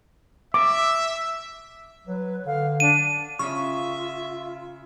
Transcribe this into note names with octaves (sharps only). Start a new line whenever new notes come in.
E5 D6
F#3 B4
D3 F5
D4 D#7
C#3 F4 E5 C#6